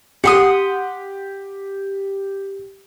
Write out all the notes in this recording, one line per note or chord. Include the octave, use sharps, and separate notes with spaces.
G4 F#5 C6 D#6